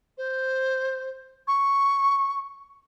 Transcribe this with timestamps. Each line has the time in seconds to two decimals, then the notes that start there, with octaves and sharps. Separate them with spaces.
0.18 C5
1.48 C#6